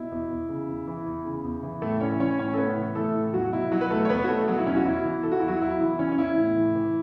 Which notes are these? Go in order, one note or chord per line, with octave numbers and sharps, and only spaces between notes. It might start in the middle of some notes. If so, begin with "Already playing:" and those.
Already playing: B2 E4
E2
E2
C#3
E2
E3
E2
C#3
E2
E3
A2 A3 A4
E3 C#4 C#5
E3 C#4 C#5
A2 C#4 C#5
A4
A2 B3 B4
E3
E3 A3 A4
A2
E2 F#3 F#4
B2 E4
B2 F#3 F#4
B4
E2 A3 A4
C#5
E2 B3 B4
F#4
B2 A3 A4
B2 F#3 F#4
E4
E2 C#4
F#4
E2 E4
E3
E3 A4
F#4
E2 E4
F#3 F#4
E2 E4
E3 E4
E3 C#4
C#4
E2 E4
A2
E3
E3